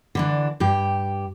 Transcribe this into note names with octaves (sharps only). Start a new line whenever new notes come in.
D3 E3 D4
G2 G4